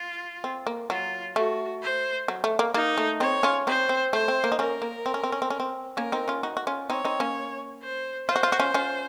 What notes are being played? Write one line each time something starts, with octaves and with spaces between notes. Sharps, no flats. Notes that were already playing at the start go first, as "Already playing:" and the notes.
Already playing: F4
C4
A#3
F#3 F4
A3 F#4
C5
F#3
A3
A#3
A#3 D#4
A3
C4 D#4 C#5
C#4 F4
C4 D#4 C5
C4
A3 C5
C4
A#3
D#4
A#3 C#4 A#4
A#3
C4
C#4
C4
C#4
C4
C#4
C4
A#3 C#4 A#4
C4 D#4
C#4 F4
D#4 F#4
F#4
C#4 F4
C4 D#4 C#5
C4 D#4
A#3 C#4
C5
F4 C5
F#4
F4
F#4
C#4 F4
C#4 F4